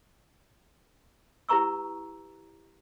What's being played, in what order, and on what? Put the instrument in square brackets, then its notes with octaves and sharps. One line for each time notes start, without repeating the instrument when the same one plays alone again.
[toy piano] E4 G4 B4 A#5 C#6 E6